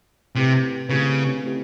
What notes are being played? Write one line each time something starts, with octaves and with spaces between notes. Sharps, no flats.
C3 A3 C4 E4 G4 B4
C#3 A3 C4 E4 G4 B4
A3 C4 E4 G4 B4